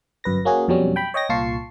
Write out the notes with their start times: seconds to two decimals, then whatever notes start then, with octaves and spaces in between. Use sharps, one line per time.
0.24 G1 F#2 B4 A#6
0.45 A#3 C#4 F#4 G#4
0.68 F2 B2 F#3 G3 C#4
0.96 G5 B5
1.14 C#5 D#5 G5 A#6
1.29 C2 A#2 F4 A5 C#6 C7